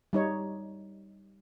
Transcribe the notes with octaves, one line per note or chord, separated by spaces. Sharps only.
G3 D#4 C#5